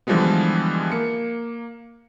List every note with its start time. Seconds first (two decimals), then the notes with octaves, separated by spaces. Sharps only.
0.07 D3 E3 F3 G3 G#3 B3
0.92 A#3 C#7